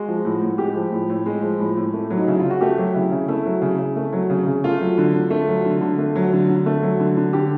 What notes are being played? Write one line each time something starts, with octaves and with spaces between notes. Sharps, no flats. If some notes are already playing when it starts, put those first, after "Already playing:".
Already playing: G#3 F#4
F3
A2
A2
G#3 G4
F3
A2
A2
G#3
F3
A2
A2
A3
F#3
D#4
C#3 E4
C#3 F4
F#4
A3 G4
F#3
C#3 E4
C#3
A3 E4
F#3
C#3
C#3
A3
F#3
C#3
C#3
A3 F4
F#3
D3
D3
A3
F#3
D3
D3
A3
F#3
D3
D3
A3
F#3
D3
D3
D3 G4